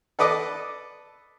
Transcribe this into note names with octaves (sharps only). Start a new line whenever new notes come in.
A4 B4 D5 D#5 D6